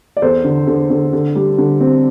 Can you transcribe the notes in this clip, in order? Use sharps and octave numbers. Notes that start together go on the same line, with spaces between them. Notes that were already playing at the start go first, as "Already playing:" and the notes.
D5
E2 A4 C5
D3
D3
D3
D3
G3
D3
C4